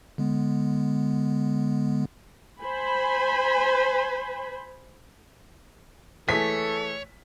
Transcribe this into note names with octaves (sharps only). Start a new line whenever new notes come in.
D3 G#3 B3
C5 G#5 B5
E3 A3 G#4 A4 C#5 B6